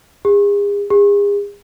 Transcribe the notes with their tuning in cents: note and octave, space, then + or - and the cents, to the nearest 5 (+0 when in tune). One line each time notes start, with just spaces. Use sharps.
G#4 -40
G#4 -40